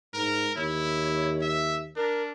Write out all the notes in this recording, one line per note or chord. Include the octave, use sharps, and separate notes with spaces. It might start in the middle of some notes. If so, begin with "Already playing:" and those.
G#2 A#4
D#2 E4 C#5
E5
D4 A#4